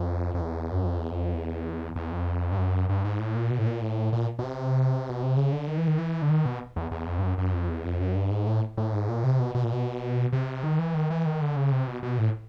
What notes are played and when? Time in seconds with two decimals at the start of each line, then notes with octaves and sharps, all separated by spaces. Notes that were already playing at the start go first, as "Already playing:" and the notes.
Already playing: F2
0.34 F2
0.41 E2
0.72 F#2
0.85 F2
0.98 E2
1.11 F2
1.34 E2
1.96 E2
2.12 F2
2.52 G2
2.58 F#2
2.89 G2
3.05 G#2
3.19 A2
3.35 A#2
3.51 B2
3.58 A2
3.66 A#2
3.81 A2
4.13 A#2
4.39 B2
4.44 C3
5.09 B2
5.23 C3
5.37 C#3
5.52 D3
5.67 D#3
5.78 E3
5.87 D#3
5.98 E3
6.22 D3
6.30 D#3
6.45 B2
6.76 E2
6.91 E2
7.07 F2
7.18 G2
7.23 F#2
7.38 F#2
7.53 F2
7.69 E2
7.85 F2
8.00 F#2
8.15 G2
8.31 G#2
8.47 A2
8.78 A2
8.93 G#2
9.09 A#2
9.24 C3
9.40 B2
9.55 B2
9.64 A#2
9.73 B2
10.33 C3
10.63 D#3
10.79 E3
10.94 D#3
11.10 E3
11.26 D#3
11.41 D3
11.56 C#3
11.72 C3
11.87 B2
12.03 B2
12.18 A2